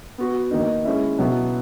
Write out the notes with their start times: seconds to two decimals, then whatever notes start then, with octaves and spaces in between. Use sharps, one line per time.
0.18 B3 F#4 B4
0.51 D#3 A#3 D#4
0.85 G#3 C#4 E4
1.18 B2 F#3 B3 E4